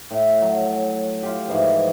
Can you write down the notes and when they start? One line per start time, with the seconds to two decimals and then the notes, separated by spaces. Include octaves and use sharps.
0.11 A2
0.41 F#3
1.23 F4 G4
1.48 G#2 E3 F3